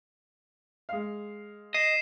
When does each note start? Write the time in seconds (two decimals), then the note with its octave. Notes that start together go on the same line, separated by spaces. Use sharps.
0.89 G#3 F5
1.74 D#5 C7 E7